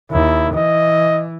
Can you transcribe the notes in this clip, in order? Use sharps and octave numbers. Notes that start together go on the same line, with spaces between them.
D#2 E4
E3 D#5